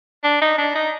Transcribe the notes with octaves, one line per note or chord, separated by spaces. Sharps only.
D4
D#4
D4
D#4